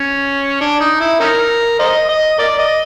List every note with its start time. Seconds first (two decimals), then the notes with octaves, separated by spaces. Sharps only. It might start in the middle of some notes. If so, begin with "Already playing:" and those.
Already playing: C#4
0.61 D4
0.81 D#4
1.00 E4
1.20 C#4 D#4 A#4
1.79 C5 D#5
2.09 D#5
2.39 A#4 D5
2.59 D#5